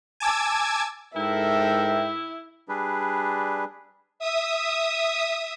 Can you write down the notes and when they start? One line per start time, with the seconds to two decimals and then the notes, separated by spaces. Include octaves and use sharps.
0.20 G#5 A5 D6 E6 G#6
1.16 G#2 E4 A4 A#4 E5 G5
2.69 G3 D4 G#4 B4
4.19 E5 D#6